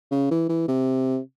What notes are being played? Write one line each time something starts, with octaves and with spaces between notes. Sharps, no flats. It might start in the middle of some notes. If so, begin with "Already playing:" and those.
C#3
E3
E3
C3